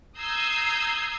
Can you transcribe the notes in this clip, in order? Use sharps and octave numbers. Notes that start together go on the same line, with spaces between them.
A#5 D#6 E6 G6 G#6 C7